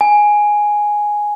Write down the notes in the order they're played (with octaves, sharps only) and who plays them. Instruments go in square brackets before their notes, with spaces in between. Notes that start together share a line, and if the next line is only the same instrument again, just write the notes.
[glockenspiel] G#5